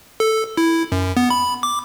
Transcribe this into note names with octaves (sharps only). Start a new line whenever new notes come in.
A4
E4
F#2
B3
B5
D6